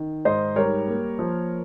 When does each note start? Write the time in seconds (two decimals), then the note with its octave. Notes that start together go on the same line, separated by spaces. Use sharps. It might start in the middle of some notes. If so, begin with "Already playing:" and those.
Already playing: D#3
0.25 G#2 C5 D#5
0.56 G3 A#4 C#5
0.88 A#3
1.19 F3